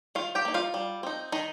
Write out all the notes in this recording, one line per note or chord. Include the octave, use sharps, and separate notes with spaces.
D#3 F4 F5
G4 G5
A#3 D#4
F4 F5
G3
C4 D#4
D#3 D#4 D#5